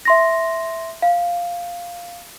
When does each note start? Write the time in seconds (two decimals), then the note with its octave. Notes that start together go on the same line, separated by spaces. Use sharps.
0.05 E5 C6 A#6
1.02 F5